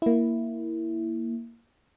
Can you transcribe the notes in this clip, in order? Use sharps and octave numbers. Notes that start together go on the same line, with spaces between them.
A#3 E4